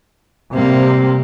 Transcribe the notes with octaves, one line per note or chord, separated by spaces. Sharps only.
C3 G3 A#3 C4